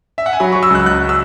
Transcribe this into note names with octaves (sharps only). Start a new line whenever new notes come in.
E5
F#5
G#5
F#3 B5
F#3 C#6
E6
C#2 F#6
C#2 F#6
E6